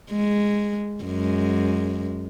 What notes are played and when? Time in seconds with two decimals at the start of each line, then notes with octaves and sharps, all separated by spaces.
0.11 G#3
1.04 F#2 G#3